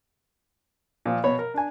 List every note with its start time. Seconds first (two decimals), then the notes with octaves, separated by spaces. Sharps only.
1.06 A#2 F3
1.24 B2 C#5 B5
1.39 A#4
1.54 D4 G#5